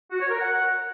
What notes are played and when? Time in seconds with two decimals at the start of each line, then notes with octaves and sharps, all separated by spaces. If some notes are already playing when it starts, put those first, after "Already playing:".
0.12 F#4
0.21 C#5
0.30 A#4
0.40 F#5